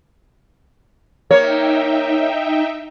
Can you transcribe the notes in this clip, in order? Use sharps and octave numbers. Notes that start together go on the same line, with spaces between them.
A#3 D#4 C#5 E5 G5